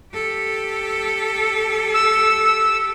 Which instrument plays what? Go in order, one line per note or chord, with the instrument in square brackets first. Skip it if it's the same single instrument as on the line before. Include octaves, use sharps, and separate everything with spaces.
[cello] G4 A4
[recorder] E6